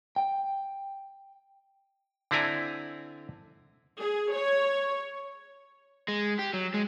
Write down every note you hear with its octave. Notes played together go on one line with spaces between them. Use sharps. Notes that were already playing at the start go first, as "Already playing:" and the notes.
G5
D3 C4 E4 D5 G#5 A#5
G#4
C#5
G#3
G4
F#3
G#3